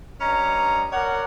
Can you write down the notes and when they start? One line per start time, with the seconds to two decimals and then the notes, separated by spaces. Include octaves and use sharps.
0.21 G2 C#4 D#5 A#5
0.92 A#4 C#5 D5 F#5